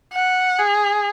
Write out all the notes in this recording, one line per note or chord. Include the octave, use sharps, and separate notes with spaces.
F#5
G#4